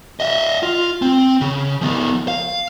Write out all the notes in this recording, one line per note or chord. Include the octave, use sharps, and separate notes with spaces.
D#5 E5
F4
C4
C#3
F3 B3
F5